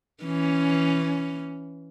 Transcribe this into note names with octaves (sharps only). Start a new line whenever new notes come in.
E3 C#4